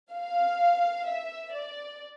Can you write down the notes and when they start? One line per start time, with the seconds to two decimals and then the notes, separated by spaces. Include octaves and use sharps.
0.12 F5
1.06 E5
1.52 D5